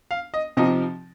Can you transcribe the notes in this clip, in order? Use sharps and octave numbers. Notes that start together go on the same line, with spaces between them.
F5
D#5
C3 F3 C4 D#4 D#5